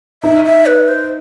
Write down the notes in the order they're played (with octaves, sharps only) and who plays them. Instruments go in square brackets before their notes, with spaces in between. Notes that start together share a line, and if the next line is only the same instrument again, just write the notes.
[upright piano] D#4 [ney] E5
[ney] E5
B4
C5